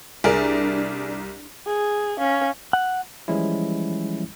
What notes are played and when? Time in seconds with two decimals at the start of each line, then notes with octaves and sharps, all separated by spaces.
0.24 C2 D4 G#4 A#4 D5
1.67 G#4
2.18 C#4 F5
2.73 F#5
3.28 E3 F3 G3 G#3 C#4 E4